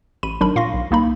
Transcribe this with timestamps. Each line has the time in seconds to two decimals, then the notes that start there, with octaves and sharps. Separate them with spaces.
0.23 A1 B5 D#7
0.41 G#1 F#3 D4 D#4 A#4 B5
0.56 A#2 F5 C6 C#6 A#6
0.74 B1
0.91 C2 A#3 D#4 B5